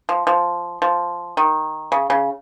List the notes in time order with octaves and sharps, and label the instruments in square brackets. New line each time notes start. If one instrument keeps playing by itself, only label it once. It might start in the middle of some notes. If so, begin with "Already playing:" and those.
[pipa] F3
F3
F3
D#3
C#3
C#3